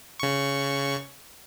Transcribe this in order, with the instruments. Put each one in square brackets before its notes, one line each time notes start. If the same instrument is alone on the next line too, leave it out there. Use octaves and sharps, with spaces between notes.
[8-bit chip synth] C#3 C#6